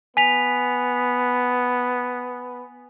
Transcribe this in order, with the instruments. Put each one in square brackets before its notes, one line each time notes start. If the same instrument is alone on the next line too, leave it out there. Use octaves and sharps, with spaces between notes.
[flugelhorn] B3 [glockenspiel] G#5 B6 F7